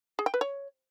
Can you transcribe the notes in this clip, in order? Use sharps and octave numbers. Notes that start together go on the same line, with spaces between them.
G#4
G5
B4
C#5